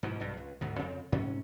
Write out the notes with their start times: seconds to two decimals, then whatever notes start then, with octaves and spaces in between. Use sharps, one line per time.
0.03 G#2 B2 E3 F3
0.20 B1 G2
0.37 C#2
0.61 D2 G#2 B2
0.79 F2 C#3 C4
1.12 G#2 C3 C#4